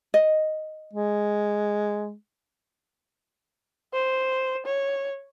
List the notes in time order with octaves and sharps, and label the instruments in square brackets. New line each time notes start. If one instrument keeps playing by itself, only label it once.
[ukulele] D#5
[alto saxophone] G#3
[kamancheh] C5
C#5